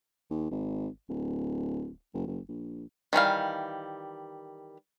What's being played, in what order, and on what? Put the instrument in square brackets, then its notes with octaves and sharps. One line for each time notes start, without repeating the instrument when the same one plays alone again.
[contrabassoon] D#2
G#1
D1
F#1
F#1
A#1
[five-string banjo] D#3 E3 G3 F5